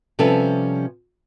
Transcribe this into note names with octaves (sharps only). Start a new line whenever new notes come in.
C3 F3 G3 C#4 A4 B4